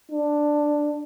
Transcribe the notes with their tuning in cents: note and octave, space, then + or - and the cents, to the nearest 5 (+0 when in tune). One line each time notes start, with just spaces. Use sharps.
D4 +5